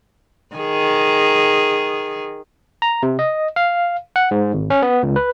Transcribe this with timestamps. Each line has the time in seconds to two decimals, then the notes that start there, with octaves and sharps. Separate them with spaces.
0.56 D#3 G#4
2.82 A#5
3.03 C3
3.19 D#5
3.56 F5
4.16 F#5
4.31 G#2
4.54 G#1
4.70 C#4
4.82 B3
5.03 C#2
5.16 B4